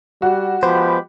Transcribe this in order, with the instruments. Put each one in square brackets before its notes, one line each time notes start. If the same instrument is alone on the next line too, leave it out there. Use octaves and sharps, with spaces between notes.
[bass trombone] G3 [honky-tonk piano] F#4
[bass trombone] F3 [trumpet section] G#3 G4 B5 [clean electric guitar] B3 C5